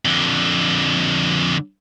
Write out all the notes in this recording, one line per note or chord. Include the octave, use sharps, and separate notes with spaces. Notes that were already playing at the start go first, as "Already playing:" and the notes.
F2 D3